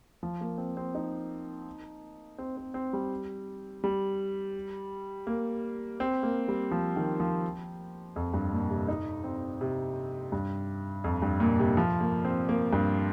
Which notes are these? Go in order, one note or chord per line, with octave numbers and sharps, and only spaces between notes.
F3
A#3
C4
C4
D#4
C4
C4
C4
G3
G3
A#3
C4
A#3
G3
F3
D#3
F3
F2
G2
A#2
C3
D#4
C4
C3
G2
F2
G2
A#2
C3
F3
A#3
C4
A#3
G2